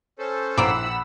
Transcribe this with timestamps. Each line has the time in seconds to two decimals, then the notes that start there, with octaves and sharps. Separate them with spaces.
0.19 C#4 A4 C5
0.58 A#1 E3 A#3 C4 F#5 B5 E6